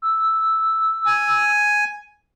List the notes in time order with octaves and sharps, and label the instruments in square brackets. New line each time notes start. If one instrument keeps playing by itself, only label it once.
[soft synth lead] E6
[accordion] G#5